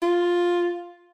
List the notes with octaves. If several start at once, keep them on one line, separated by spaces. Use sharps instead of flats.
F4